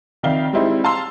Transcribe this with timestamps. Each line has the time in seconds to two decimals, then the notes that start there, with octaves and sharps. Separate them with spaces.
0.23 F2 D#3 D5 E5 F5 G7
0.53 G3 G#3 C4 D#4 E4
0.84 F5 A5 A#5 C6 E6